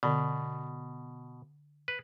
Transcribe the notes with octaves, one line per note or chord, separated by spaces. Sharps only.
B2 D3 D5
B4